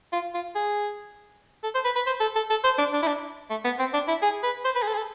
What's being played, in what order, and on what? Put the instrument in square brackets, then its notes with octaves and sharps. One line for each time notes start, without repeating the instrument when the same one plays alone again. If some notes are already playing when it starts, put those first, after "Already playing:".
[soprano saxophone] F4
F4
G#4
A4
C5
B4
B4
C5
A4
A4
A4
C5
D4
D4
E4
D4
A3
B3
C4
D4
E4
G#4
B4
C5
B4
G#4
A4
G#4
A4